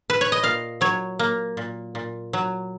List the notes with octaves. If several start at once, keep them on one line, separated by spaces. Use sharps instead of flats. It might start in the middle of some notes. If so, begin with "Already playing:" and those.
B4
C#5
D#5
A#2 F5
F#3 C#5
A#3
A#2
A#2
F#3